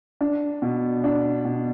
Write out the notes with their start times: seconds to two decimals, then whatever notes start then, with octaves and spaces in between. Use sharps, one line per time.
0.21 D4
0.62 B2
1.04 D4
1.45 B2